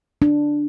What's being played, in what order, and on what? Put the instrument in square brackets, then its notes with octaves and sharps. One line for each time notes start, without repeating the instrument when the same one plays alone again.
[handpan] D4